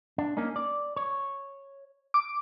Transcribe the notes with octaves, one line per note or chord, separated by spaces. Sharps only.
D4
A#3 C#4 D#4
D5
C#5
D6